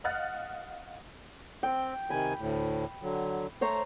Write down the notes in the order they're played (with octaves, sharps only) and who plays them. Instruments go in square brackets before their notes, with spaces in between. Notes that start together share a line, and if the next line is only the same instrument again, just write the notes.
[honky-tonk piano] D#5 F5 F#5 F6 F#6 A6
[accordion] C4 [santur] G5
[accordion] C3 D#3 G#5 [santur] B5
[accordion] D2 A2
D3 F#3
[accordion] A3 [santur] C5 C#5 A#5